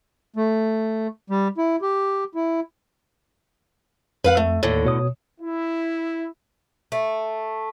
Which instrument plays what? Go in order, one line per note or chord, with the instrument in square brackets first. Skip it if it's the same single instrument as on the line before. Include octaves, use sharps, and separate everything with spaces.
[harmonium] A3
G3
E4
G4
E4
[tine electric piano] F2 [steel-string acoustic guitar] B4 F5 F#5
[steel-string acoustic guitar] A3
[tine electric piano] D#2 A4 [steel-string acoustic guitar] A2 D3
[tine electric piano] B2 C#5 D#6
[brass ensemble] E4
[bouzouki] A3